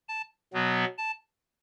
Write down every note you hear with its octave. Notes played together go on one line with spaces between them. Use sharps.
A5
B2 F#3 B3
A5